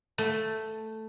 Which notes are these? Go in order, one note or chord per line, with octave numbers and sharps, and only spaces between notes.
A3